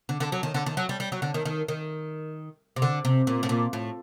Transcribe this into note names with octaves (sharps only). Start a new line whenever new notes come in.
D3
D3
F#3
D#3
D3
D#3
F#3
G3
G3
F#3
D3
D#3
D#3
D#3
C3
D3
C3
A#2
A2
A#2
A2